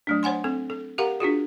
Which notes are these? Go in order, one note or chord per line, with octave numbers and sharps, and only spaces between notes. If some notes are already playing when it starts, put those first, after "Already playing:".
F#3 A3 D4
C5 C#5 F#5 G#5 C6
C4 A4
A4
G4 A#4 F5 F#5 A#5
D4 F4 F#4 G#4